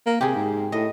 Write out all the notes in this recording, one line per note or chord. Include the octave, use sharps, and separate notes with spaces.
A#3
C3 G4 G#4
G#2
A2 D#5